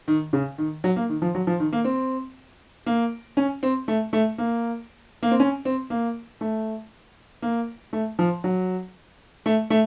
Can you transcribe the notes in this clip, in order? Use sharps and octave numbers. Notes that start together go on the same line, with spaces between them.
D#3
C#3
D#3
F#3
A#3
D#3
F3
F#3
F3
D#3
A#3
C4
A#3
C#4
C4
A3
A3
A#3
A#3
C4
C#4
C4
A#3
A3
A#3
A3
F3
F#3
A3
A3